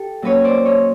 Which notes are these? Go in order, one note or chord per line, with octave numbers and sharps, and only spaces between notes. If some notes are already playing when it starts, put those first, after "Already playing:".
Already playing: G4 A4
A#2 F#3 A#3 C#4 B4 C#5
C5 D5
C#5 D#5